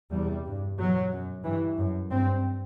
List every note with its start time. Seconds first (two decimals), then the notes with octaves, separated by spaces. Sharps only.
0.11 E2 C3 G3
0.45 G2
0.78 E2 B2 F#3
1.11 F#2
1.44 G2 E3
1.77 F#2
2.11 G2 C4